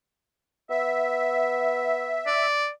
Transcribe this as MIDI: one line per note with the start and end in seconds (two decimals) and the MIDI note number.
0.70 2.28 59
0.70 2.46 76
2.27 2.70 74